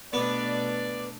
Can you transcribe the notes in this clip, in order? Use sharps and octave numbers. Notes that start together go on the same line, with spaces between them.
B2 A3 B3 D4 B4 D5